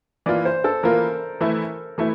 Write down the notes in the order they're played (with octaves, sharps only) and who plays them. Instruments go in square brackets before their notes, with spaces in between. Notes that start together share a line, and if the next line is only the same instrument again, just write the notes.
[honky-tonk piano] E3 A#3 F4 [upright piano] D5
[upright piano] C5
A4
[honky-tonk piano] E3 A#3 F4 [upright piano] A#4
[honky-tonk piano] E3 A3 E4
E3 A3 E4